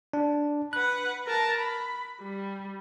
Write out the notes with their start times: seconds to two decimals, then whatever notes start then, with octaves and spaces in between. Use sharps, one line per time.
0.13 D4
0.73 B4 F#5 F#6
1.26 A#4 A5
1.58 B5
2.21 G3